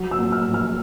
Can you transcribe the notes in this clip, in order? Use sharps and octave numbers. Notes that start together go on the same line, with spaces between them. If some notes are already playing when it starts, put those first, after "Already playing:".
Already playing: F#3
E6
A#2
F6
A#1
F6